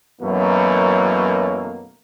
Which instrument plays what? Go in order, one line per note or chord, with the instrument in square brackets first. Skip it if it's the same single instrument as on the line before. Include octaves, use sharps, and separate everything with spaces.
[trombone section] F#2 B2 E3 F#3 A3 A#3